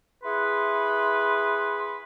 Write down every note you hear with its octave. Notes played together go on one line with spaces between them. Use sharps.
E4 G#4 B4 F#5 C6